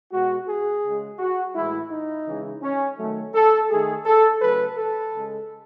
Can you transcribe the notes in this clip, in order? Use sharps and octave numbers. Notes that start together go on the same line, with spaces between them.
B2 G#3 F#4
G#4
C#3 G#3
F#4
A2 E3 G#3 E4
D#4
C#3 E3 G#3
C#4
D#3 F#3 A3
A4
D#3 A3 G#4
A4
C#3 F#3 A3 B4
A4
C#3 G#3